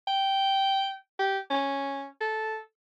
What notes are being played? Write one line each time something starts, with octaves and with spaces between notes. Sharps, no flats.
G5
G4
C#4
A4